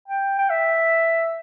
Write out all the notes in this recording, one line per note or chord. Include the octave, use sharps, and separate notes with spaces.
G5
G5
E5